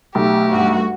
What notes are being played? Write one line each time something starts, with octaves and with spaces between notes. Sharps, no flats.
B1 A3 G4
G2 F#4